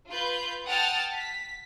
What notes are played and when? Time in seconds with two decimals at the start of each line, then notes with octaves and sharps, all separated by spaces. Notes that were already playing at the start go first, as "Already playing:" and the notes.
0.12 F4 B4 G6
0.66 F#5 G5 A5 D#6 F6 A6
1.16 B6